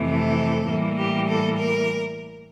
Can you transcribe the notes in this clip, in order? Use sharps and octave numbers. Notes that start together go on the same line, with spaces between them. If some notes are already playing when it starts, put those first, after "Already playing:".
Already playing: F2 C3 E3 A3
A4
A2 E3 G3 A#3
G4
A4
A#4